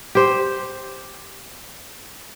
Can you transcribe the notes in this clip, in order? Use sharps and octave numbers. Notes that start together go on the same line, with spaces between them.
G4 C5